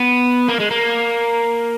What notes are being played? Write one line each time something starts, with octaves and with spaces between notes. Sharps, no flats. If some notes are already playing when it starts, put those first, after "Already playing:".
Already playing: B3
A#3
G#3
A#3